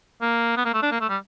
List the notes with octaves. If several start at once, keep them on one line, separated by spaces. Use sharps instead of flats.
A#3
B3
A#3
A3
D4
A#3
A3
G3